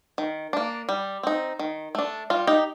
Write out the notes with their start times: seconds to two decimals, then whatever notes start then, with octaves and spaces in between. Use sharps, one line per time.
0.18 D#3
0.53 A#3 D4
0.89 G3
1.23 C4 D#4
1.59 D#3
1.95 A3 D4
2.30 G3 F4
2.47 D#4 G4